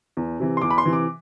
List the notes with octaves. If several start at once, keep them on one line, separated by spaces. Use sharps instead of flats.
E2
C3 E3
C6
E2 D6
B5
C6
C3 E3
D6